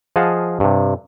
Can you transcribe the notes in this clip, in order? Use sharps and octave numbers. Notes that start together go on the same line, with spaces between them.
F3 G#4 D#5 F5 F#5 A5
G2 C3